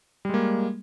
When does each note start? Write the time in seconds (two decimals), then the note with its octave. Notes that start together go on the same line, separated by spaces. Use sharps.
0.25 G3
0.29 G#3
0.34 A#3